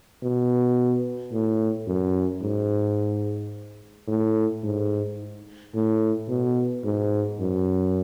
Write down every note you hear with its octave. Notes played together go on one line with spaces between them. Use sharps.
B2
A2
F#2
G#2
A2
G#2
A2
B2
G#2
F#2